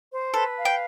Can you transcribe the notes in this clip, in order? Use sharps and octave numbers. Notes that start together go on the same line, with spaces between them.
C5
A4 B4
F5
G5